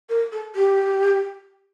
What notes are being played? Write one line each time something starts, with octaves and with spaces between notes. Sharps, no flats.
A#4
A4
G4